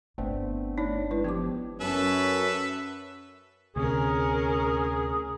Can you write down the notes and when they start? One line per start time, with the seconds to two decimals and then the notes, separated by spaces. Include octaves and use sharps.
0.18 G1 A3 B3 C4 D4
0.78 D4 D#4 C#5
1.11 G#3 E4 B4
1.24 F3 B3 G4 D6
1.81 F#2 C#4 A4 B4 E5
3.76 D2 C3 C#4 G#4 A#4